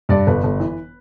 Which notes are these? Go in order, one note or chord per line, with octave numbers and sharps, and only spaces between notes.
G2 D5
G1 B4
G1
E3